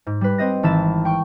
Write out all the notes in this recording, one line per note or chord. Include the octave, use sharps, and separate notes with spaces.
G#2
G3 B4
C4 D#5 A#6
G#1 E3 A4 A5 B5 E7
G5 C#6